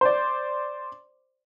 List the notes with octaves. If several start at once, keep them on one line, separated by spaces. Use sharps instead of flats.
C5 D5